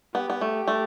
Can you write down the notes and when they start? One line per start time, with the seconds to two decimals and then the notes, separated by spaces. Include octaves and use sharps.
0.15 B3 G4
0.30 B3
0.41 A3
0.68 A3